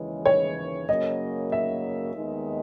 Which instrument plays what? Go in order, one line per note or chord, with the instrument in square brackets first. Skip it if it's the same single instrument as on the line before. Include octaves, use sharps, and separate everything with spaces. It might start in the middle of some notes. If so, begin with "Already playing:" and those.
Already playing: [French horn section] D#2 C#3 E3 G#3
[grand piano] C#5
[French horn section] F#2 C#3 F#3 A#3 [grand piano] D#5
[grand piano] E5
[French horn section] D#2 D#3 G#3 B3 D#4